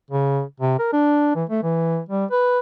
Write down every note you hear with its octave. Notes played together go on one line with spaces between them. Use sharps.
C#3
C3
A#4
D4
E3
A3
E3
G3
B4